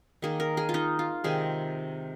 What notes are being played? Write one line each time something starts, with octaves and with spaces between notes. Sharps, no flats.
D#3 A#3 D#4 G#4
A#4
G#4
F4
D#4
F4
C3 D#3 G#3 C4 G#4